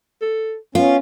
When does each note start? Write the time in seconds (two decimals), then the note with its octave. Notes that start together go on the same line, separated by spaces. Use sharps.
0.21 A4
0.75 B3 C#4 F4